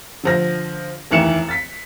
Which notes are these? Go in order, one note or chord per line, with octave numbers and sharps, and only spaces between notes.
D3 F3 A#6
F1 D#2 E3 C#7 E7
A6 B6